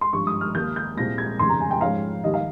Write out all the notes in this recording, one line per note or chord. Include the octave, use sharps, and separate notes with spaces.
C6
G#1 G2 F3 C#6
D#6
F6
D#2 D#3 A#3 G6
G6
C2 A#2 G#3 C4 A#6
G#6
F1 D#2 C#3 C6
A#5
G#5
G5
G#2 F3 G#3 C#4 F5
D#2 D#3 G3 D#5
F5